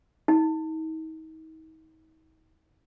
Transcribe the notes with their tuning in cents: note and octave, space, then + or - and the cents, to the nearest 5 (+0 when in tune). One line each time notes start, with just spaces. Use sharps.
D#4 +40